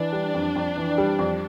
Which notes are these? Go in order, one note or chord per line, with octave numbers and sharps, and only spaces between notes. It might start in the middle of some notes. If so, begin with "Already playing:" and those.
Already playing: E3 D4
G3
F2
F2
E3
G3
F2